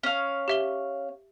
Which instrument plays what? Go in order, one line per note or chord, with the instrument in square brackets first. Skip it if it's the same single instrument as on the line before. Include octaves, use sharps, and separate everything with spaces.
[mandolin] C#4 F5
[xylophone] G4 E5 G7